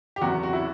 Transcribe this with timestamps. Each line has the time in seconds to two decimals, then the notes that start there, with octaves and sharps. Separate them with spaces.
0.16 G4
0.21 F#1 E2 C3 F#4
0.43 F#4
0.53 E4